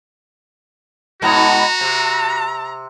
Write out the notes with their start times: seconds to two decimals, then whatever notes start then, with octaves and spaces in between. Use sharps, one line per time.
1.22 G#2 B2 B3 F#4 A#5
1.81 C3 A#5